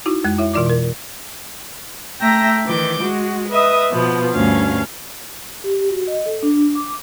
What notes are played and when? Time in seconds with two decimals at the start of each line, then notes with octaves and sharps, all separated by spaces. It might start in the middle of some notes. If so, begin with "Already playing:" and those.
0.06 D#4 E4 F#4
0.24 F2 G#3 F#6 G#6
0.39 E4 C#5 E5
0.53 B2 E3 F4 D5 D6
0.66 B2 A#4
2.21 A3 E5 G5 A#5 A#6
2.65 D#3 E3 D6 G6
3.01 G#3 F#4
3.50 B4 D#5 E5 D#6
3.90 B2 F3 B3
4.33 D2 G2 C#4 F5
5.64 G4
5.90 F#4
6.08 D#5
6.26 A4
6.43 D4
6.75 D6